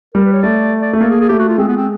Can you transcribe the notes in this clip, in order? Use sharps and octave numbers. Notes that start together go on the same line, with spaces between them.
G3 A#4
B4
C#5
A3 D5
D5
A3
A#3 A4
G#4
G#4
A3 G4
F#4
F4
G#3 C4
B3
C4